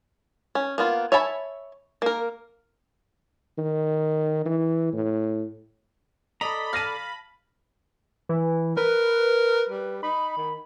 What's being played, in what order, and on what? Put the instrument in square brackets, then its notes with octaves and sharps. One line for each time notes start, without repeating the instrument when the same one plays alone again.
[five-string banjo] C#4
A#3 B3 F4
C#5 E5 G#5 A5 B5
A#3 A#4
[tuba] D#3
E3
A2
[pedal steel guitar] A4 D5 A#5 [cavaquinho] D#5 [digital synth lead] B5
[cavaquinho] F5 A5 [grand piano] F6 A#6 D#7
[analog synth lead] E3
[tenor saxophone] A#4 [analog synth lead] B4
[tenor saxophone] G3
[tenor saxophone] D#4 [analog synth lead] B5
[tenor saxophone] D#3